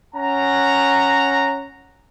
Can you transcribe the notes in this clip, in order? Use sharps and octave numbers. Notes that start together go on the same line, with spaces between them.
C#4 F#5 A#5